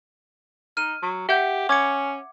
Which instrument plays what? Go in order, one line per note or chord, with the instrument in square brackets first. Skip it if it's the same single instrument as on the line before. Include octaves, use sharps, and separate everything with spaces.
[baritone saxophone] D#4 [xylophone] F6 D#7
[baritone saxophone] F#3
[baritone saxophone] G4 [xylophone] E5 F#5 G6
[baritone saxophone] C#4 [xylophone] D6 G#6 C#7